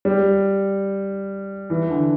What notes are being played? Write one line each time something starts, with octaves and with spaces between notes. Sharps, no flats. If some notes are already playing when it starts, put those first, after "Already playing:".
G3
E3
D3